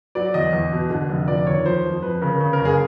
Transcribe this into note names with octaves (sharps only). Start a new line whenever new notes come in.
F#3 D5
E2 D#5
E2
B2
D3
F1
F3 D5
D#2 C#5
F3 C5
F2
F2 B4
C#3 A#4
C#3
A#4
F#1
G#4